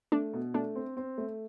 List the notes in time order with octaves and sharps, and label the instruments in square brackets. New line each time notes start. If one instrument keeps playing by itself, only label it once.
[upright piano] A3 [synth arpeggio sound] D4
[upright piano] B2
[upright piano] A3 [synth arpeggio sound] D4
[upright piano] C4
C4
A3